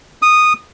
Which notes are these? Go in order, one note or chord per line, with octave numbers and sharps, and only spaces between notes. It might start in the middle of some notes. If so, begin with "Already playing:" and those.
D#6